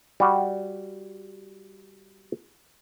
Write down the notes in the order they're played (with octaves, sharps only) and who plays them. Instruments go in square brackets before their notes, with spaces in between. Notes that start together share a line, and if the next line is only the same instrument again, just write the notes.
[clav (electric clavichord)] G3 F#4